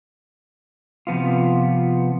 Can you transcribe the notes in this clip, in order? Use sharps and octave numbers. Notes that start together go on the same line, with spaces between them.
C3 F3 B3 F4